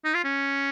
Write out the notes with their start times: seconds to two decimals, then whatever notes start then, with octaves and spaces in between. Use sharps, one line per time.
0.05 D#4
0.14 F4
0.24 C#4